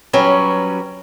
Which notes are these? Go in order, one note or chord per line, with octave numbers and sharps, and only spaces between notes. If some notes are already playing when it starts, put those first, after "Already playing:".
F#3 G3 C#4 B4